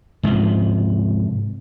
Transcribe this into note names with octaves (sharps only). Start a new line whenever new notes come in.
G#2 C3 F3